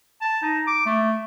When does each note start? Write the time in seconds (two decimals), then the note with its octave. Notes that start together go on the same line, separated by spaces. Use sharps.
0.21 A5
0.42 D#4
0.67 D6
0.86 A3